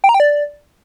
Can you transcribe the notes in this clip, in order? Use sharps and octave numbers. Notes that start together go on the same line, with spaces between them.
G5
A#5
G5
D5